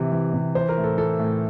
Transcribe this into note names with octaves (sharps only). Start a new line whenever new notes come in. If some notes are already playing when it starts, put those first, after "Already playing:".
Already playing: C3 E3
E3
C3
E3 C5
A#4
A2
A4
E3 A4
A2